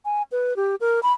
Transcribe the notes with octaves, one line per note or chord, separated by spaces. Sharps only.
G#5
B4
G4
A#4
B5